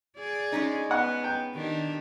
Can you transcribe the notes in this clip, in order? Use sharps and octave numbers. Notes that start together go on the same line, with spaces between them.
G#4 D5
G#3 C#4 D#4
B3 F#5
G5
D#3 D4 G4